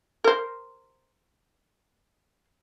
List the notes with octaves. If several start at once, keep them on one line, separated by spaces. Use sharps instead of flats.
A#4 C5